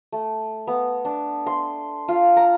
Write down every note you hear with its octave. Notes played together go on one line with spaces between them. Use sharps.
A3
B3
D4
C6
F4
A#5